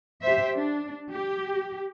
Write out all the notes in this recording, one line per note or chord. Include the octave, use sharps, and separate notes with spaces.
G4 C5 E5
D4
G4